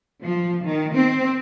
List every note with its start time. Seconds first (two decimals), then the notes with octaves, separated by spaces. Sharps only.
0.23 F3
0.64 D#3
0.94 C4